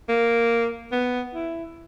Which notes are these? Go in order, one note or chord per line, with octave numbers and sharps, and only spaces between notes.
A#3
B3
E4